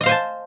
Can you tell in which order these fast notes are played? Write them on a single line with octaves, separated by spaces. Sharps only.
D#5 F5 C5 G#5 A5